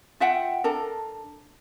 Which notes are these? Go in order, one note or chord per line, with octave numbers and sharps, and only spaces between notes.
F4 E5 F#5 G5
D4 A4 A#4